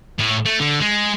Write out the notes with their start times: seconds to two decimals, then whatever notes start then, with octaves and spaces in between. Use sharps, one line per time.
0.19 A2
0.45 A3
0.60 D3
0.81 G#3